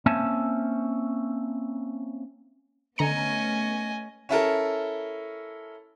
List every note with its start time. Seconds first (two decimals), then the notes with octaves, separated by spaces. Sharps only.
0.06 A#3 C4 C#4 E5 G#5 A5
2.98 D3 A3 B3 C#4 D#5 G#5 A#5 C#7
4.29 C#4 E4 A4 A#4